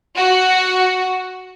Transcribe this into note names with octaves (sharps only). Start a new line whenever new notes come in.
F#4